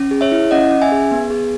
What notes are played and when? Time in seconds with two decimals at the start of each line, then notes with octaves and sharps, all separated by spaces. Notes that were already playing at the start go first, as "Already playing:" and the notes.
Already playing: C#4
0.11 G#4
0.21 C#5 E5
0.32 E4
0.51 C#4 D#5 F#5
0.71 C#4
0.82 E5 G#5
0.92 G#4
1.11 B3
1.31 G#4